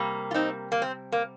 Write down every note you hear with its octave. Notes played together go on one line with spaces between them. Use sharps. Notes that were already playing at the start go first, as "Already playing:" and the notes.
Already playing: C3 G3 A#3
F4
C4 D#4
A#3
C4
A#3